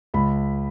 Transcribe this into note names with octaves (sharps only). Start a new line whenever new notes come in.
C#2 B5